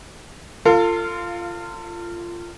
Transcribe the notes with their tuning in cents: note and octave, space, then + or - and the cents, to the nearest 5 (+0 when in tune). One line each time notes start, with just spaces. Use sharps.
F4 -15 A4 +35 F5 +0